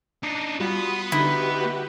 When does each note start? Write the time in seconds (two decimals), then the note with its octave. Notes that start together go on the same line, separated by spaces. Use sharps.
0.23 D4 D#4
0.60 G3 B3 F4 F#4 B5 C6 D#6
1.12 D3 D#4 E4 F#4 G4 B4